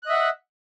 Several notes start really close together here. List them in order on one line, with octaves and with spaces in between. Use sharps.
F#6 D#5 E5 F#5